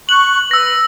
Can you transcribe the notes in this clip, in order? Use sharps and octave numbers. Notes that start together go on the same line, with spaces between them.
C#6 F#6 F#7
B4 E6 A#6